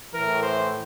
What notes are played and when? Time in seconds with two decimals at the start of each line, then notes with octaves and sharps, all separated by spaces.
0.14 A2 E3 A#4
0.43 C5